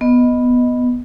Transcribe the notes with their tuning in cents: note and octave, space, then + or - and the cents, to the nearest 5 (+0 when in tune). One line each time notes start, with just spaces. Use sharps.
B3 +0 D#5 +0